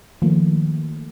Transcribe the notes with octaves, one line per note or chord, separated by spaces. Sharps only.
D#3 F3 A3 A#3